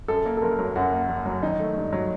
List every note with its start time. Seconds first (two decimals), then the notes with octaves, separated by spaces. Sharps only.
0.08 F#2 A4
0.26 A#3
0.37 A4
0.42 F#1 A#4
0.59 F#3
0.76 F#2 F#4
0.93 A#3
1.09 F#1
1.26 F#3
1.43 D#3 D#4
1.60 A3
1.77 G2
1.93 F#3